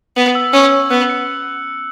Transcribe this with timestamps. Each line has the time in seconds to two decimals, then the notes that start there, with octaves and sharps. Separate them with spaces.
0.16 B3 F#7
0.35 E6
0.53 C#4 E6
0.72 E6
0.91 B3 F#6
1.10 C#7